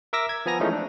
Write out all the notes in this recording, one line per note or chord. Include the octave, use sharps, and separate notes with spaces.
A#4 E5 D6 E6 A#6
G#6
F3 B3 G#5 A#5 A#6
E3 F3 G#3 A3 C#4 D#4
D4